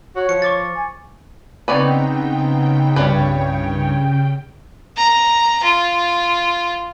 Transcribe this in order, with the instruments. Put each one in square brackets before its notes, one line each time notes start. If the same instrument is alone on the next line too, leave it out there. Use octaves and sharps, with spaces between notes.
[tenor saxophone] F#4 [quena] C#5
[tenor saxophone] F3 [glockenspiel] C#7
[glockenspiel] C#6 D6 A6
[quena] G#5
[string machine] C#3 G5 [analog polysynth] B3 C4 D#4 [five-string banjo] B4 C#5 D5
[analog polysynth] C2 G2 C#5 [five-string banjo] G3 F4 B4
[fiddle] A#5
F4